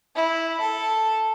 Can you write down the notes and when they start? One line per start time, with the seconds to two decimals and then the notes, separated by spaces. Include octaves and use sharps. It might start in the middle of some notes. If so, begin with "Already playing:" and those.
0.15 E4
0.60 A4